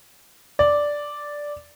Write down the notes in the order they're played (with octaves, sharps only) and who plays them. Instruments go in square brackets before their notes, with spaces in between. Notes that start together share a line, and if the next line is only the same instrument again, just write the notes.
[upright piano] D5